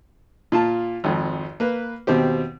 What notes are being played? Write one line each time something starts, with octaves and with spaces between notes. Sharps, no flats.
A#2 F4 A5
G#1 F2
A#3 B4
D#2 B2 C4 G4